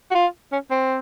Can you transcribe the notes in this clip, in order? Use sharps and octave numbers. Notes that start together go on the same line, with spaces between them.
F#4
F4
C#4
C4